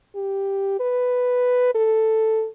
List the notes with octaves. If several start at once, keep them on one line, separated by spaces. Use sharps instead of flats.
G4
B4
A4